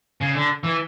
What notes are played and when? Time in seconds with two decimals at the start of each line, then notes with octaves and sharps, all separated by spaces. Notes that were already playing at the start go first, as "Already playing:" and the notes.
0.21 C#3
0.35 D3
0.63 E3